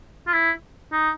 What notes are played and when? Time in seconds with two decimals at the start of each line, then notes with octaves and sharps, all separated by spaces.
0.27 F4
0.33 E4
0.92 D#4